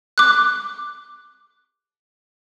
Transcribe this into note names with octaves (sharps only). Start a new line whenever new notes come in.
D6 F#6